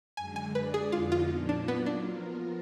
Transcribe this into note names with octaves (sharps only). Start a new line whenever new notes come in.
F#2 D3 G#3 G#5
G#5
G#3 D4 G#4 B4 D5
G#4
F2 D3 G#3 B3 D#4 F4
F4
A#2 F3 A#3 D4 F4
D4
F#3 A#3 B3 F4
D4
F3 B3 F4 A#4